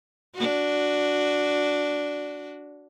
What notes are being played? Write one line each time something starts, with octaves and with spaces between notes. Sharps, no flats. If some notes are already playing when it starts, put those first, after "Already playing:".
D4 F#4